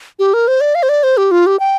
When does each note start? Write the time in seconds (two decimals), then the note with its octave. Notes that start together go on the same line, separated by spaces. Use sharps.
0.19 G4
0.34 A#4
0.48 C5
0.61 D5
0.75 F5
0.83 C5
0.89 D5
1.03 C5
1.17 G4
1.31 F4
1.46 G4
1.60 G5